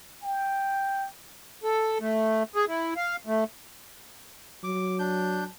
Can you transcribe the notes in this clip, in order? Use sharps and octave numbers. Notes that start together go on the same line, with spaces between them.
G5
A4
A3
G#4
E4
F5
A3
F#3 D6
D4 G6